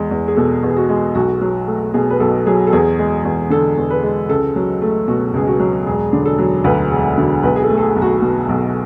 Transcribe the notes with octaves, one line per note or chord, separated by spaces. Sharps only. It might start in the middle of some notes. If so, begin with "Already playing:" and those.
Already playing: E2 G#3
E2
G#4
B2 A4
E2
G#4
F#4
G#3
B1 F#4
F#3
A3
B2 G#4
B4
B1 A4
F#3 G#4
A4
E2 G#4
G#3
E2
D3 A4
E2
B4
G#3
C#2 A4
F#3
A3
B2 F#4
C#2 G#4
F#4
F#3
E1 G#4
D3
A4
F#3
D2 B4
E1
D3
B1 B4
G#4
A4
A3
A4
G#4
B1
F#4
B2
B1